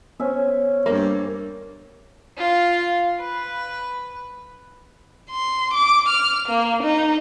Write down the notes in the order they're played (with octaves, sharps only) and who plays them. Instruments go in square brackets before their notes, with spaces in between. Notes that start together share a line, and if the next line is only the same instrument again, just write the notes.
[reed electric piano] B3 C5 [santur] C#4 E5
[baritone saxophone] G2 [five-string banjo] A#3
[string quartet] F4 F5
B4
[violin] C6
D6
F6
A#3
D#4